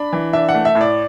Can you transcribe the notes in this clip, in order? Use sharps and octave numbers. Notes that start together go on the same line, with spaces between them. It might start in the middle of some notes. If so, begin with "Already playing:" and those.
Already playing: D4 B5
E3
D4 E5
F#5
A3
E5
A2
D5